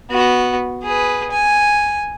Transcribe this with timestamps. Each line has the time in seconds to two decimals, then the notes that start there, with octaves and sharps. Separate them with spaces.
0.10 B3 F#4
0.83 G#4 B4
1.31 G#5